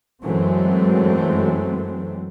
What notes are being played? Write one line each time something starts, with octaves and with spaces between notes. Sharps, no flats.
F#2 E3 F#3 G#3 A3 C4